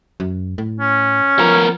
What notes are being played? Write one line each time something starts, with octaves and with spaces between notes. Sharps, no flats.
F#2
A2
C#4
F3 B3 A#4